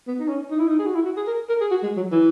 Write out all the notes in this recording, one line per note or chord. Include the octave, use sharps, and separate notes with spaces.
B3
D#4
C#4
D#4
E4
D#4
G#4
F#4
E4
F#4
G#4
A#4
A#4
G#4
F#4
G#3
F#3
E3